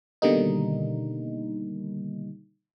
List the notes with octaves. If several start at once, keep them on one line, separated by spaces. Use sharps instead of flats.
B2 D3 D#3 G3 A#3 D#4